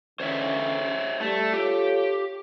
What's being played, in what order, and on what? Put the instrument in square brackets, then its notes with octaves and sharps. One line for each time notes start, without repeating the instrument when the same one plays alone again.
[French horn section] D3 E3 C#4 [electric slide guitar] C5 C#5 E5
[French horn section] G3 [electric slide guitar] A3
[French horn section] F4 A4 C#5 [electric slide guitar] G4